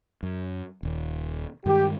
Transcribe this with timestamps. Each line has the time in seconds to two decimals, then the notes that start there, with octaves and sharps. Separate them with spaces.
0.23 F#2
0.83 D#1 D#2
1.66 G2 D#3 G#3 G4